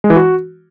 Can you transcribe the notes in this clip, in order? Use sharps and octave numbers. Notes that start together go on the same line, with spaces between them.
G#3
E3
F#4